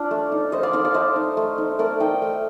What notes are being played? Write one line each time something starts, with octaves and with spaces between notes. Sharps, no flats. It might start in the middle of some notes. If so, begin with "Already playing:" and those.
Already playing: D4 F4 D5
A3
D#4
A3 C5 D#5
D5 F5
D#4 D5 F5
D5 F5
A3 C5 D#5
D#4
A3
D#4
A3 A#4 D5
D#4 D#5 G5
A3